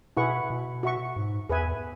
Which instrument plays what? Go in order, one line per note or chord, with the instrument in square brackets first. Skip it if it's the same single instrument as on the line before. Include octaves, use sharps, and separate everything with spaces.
[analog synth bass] B2 [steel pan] E4 G#4 B4 F#5 C#6
[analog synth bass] B2
[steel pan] F#4 E5 C#6
[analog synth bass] G#2
[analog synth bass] E2 [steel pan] G#4 B4 E5 G#5